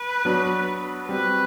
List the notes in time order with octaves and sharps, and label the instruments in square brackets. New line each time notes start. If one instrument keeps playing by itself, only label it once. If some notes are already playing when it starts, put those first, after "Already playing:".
Already playing: [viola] B4
[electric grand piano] F#3 B3 D4 F#4
[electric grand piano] G3 C4 F#4 [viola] B4